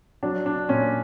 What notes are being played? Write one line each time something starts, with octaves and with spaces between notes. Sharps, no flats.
F#3 D4
D4
A#2 C#4